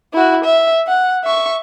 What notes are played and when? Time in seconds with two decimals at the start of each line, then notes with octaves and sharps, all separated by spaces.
0.13 E4 F#4
0.44 E5
0.87 F#5
1.24 E5 C#6